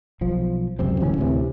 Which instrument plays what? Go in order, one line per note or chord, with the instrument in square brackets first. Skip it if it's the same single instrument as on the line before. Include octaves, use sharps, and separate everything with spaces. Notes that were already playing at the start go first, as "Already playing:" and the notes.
[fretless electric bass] B1 F3
C#2 F#2 C3 C4
D1 D2 E3 C#4
D2 A2 C3 E3